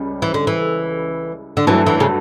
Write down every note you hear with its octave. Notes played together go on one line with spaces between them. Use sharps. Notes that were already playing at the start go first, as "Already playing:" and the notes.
Already playing: C#2 C#3 G3 C#4
E3
D3
E3
D3
G2 E3 F#3 A3
E3
C#3